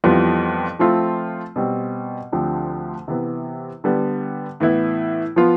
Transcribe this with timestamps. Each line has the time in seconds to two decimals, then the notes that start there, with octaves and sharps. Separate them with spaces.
0.04 F2 E3 G3 B3 F4
0.79 F3 A3 C4 F4
1.56 B2 G3 C4
2.32 D2 D3 F3 C4 G4
3.08 C3 E3 B3
3.84 D3 G3 B3
4.60 A2 E3 B3 E4
5.36 F3 B3 F4